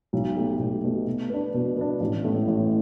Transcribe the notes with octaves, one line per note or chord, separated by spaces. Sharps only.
B1
B2 A3 G4
B1
B2 A3 G4
B2
B3 D4
B2
B3 D4
A1
A2 A3
A1